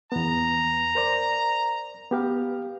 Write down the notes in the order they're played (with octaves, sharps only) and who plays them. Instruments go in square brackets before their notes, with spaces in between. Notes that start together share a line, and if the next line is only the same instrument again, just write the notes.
[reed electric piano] E2 B3 [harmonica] A#5
[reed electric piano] A#4 C5 D5
B3 G4 F5